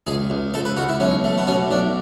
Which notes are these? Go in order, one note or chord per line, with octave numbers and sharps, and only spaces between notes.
C#2 G#4
C#2
C#2 A4
B4
C#2 F#4
E4
B1 C#4
A3
B3
B2 C#4
B1 D4